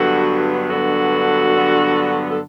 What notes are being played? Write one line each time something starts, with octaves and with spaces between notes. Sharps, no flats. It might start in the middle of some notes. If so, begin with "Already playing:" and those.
Already playing: G2 D3 F#3 B3 F#4 A4
G2 D3 F#3 B3 F#4 A4
G2 D3 F#3 B3
A4